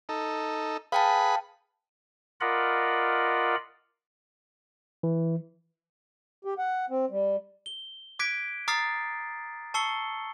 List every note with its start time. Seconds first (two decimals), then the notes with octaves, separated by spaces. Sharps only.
0.09 D#4 A4
0.92 G#4 B4 F5 G5 A5 B5
2.41 F4 A#4 D5 D#5 F#5 B5
5.03 E3
6.45 G4
6.58 F#5
6.90 C4
7.10 G3
7.66 G7
8.19 D6 F#6 G#6 B6 D7
8.68 A#5 D6 D#6 F6 A6 C7
9.74 A5 C#6 E6 C7 C#7 G7